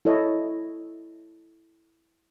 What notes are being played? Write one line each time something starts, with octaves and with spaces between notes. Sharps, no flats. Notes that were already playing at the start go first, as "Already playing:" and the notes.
E4 A4 C#5 D#5